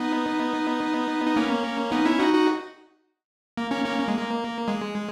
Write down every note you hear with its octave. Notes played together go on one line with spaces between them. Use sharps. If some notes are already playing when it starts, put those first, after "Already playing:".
Already playing: B3 D#4
D#4
A#3 C#4
B3 D#4
C#4 E4
D#4 F#4
D#4 F#4
A#3
A#3 C#4
A#3 C#4
A#3
G#3
A#3
G#3